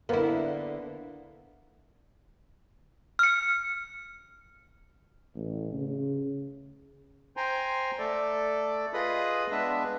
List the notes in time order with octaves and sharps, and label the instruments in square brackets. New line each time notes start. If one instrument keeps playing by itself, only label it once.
[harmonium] D3 [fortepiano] A#3 [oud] B3 E4
[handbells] F6 C#7
[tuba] A1
C#3
[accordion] C5 G5 G#5 A#5 C6
A3 A4 D5
F4 G#4 B4 D#5 B5 D#6
G#3 B3 D4 B4 E5